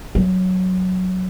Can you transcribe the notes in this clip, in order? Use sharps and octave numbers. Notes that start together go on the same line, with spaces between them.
F#3